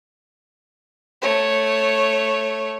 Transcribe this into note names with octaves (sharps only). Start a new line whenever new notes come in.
A3 C#5